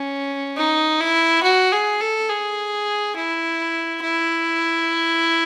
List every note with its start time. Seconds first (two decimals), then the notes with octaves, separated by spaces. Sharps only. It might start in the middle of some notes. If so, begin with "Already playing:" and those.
Already playing: C#4
0.58 D#4
1.01 E4
1.43 F#4
1.72 G#4
2.01 A4
2.29 G#4
3.17 E4
4.02 E4